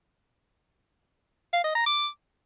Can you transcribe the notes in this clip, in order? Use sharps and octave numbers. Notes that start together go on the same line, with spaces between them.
F5
D#5
A#5
D6